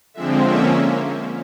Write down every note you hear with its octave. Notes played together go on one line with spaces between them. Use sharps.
D3 F3 G#3 C4 E5
D3 F3 A#3 C#4 E5